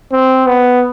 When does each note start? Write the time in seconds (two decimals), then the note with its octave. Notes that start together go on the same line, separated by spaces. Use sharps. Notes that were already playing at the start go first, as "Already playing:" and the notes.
0.12 C4
0.47 B3